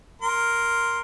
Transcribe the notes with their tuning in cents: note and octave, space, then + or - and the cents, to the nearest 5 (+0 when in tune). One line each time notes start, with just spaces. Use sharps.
A#4 +0 C6 +0